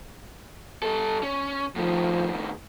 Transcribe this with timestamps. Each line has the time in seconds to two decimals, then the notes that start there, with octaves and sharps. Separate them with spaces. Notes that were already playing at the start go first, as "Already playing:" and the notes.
0.82 G3 A4
1.23 C#4
1.76 A2 D#3 F3